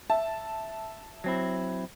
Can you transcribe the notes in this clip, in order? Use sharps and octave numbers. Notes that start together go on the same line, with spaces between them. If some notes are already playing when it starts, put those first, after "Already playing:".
E5 A5
F#3 C4 E4